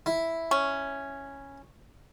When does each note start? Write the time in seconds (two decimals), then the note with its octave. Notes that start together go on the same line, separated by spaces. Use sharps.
0.06 E4
0.51 C#4